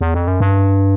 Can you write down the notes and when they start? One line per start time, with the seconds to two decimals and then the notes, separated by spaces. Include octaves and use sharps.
0.01 E2
0.14 F2
0.28 F#2
0.40 G2